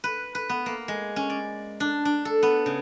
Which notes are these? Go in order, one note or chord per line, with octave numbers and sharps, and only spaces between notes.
B4
B4
B3
A#3
G#3
C#4
D5
D4
D4
A4
B3
C#3